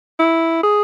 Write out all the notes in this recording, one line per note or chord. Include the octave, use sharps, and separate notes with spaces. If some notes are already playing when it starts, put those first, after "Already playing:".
E4
G#4